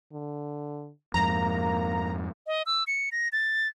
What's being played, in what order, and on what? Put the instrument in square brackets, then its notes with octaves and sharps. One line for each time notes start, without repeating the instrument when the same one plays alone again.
[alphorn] D3
[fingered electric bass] F2 G#2 [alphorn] A#3 [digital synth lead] A#5
[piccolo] D#5
E6
C#7
A#6
A6